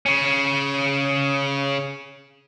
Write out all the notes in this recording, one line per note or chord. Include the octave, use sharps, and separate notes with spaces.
C#3 C#4